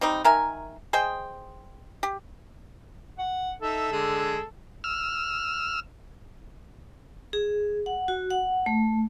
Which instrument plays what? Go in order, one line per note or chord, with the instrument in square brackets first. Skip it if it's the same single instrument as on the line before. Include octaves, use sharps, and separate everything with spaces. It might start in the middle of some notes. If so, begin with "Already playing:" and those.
[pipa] G3 C4 D#4
D#3 A#4 E5 G#5
G#4 C5 D#5 G5
G4
[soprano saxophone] F#5
[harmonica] D#4 E5 [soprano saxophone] A4
[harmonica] D3 G#3 G#4
[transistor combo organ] E6 F6
[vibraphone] G#4
F#5
F#4
F#5
A3